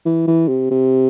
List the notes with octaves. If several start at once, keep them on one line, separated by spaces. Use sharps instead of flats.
E3
E3
C3
C3